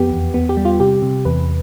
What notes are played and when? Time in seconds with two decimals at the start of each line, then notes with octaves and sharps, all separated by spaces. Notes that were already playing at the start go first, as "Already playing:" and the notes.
Already playing: F2 B3 G4
0.11 E2
0.34 B3
0.49 G4
0.57 G3
0.65 F4
0.80 C3 G4
1.02 C3
1.25 E2 B4